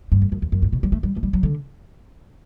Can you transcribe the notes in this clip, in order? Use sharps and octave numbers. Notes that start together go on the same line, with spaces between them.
G2
F#2
F#2
E2
F#2
G2
B2
G3
A3
G3
A3
G3
F#3
D3